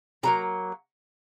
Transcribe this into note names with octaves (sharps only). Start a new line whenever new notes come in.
C#3 F#3 A#3 A#5